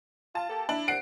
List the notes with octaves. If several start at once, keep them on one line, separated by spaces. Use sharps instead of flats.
F4 A5
A#3 G4 A4
D4 E4
C2 F#5 C7 D7